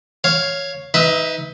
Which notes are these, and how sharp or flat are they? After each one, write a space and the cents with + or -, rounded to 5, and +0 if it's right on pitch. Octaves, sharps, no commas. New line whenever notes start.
C#5 +0 F5 +0
D#4 +25 B4 +10 E5 +0